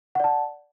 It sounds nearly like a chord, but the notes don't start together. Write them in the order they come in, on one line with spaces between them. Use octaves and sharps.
F#5 D5 A5